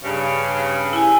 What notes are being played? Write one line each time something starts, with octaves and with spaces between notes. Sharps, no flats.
G2 C#3
E4 G#5